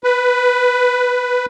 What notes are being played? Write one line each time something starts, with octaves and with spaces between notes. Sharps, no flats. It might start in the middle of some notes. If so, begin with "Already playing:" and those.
B4